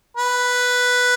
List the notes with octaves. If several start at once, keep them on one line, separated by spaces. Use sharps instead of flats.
B4